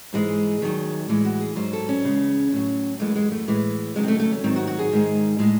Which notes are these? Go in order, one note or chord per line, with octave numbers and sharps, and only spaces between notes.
G#2 E3 G#3 G#4
D#2 D#3 F#3
A2 E3 G#3
F#4
G#4
G#2 F#3 C5
A4
C#4
E2 C#3 G#3
A2 F#3
F#2 E3 G#3 A3
G#3
A3
A2 E3 G#3
D#2 C#3 F#3 G#3
C4
A3
A3
C#4
G#2 D#3 F#3 C4
F#4
F#4
G#4
G#2 D#3 G#3
A2 G#3